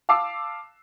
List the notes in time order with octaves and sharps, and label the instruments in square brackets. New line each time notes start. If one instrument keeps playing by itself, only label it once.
[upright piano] F5 A5 D6 E6 C7